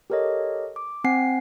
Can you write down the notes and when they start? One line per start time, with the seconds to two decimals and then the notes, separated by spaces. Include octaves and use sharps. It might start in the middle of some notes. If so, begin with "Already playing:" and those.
0.10 G4 A4 A#4 C#5 D#5
0.76 D6
1.04 C4 F#5 G#5 C7